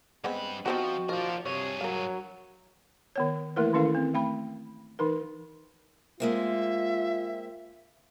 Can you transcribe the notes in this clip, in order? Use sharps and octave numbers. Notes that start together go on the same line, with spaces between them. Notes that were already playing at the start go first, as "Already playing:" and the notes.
G2 G#3 B3 C4 B5
F3 B3 C4 D#4 F#4
D#3 F3 A#4 D5
G2 C3 G#4 C#5
F#3 A#4 F5
D#3 B3 C#5
E3 A3 A#3 E4 A#4 B4
D#3 E3 C#4 E4 A4 F5
C4
A3 G5 B5
E3 D#4 A#4
G#3 A#3 C4 F4 E5